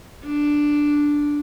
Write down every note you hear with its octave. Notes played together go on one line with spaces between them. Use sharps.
D4